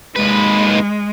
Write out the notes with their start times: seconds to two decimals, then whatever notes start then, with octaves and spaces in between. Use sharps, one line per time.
0.16 D#2 G#3 B4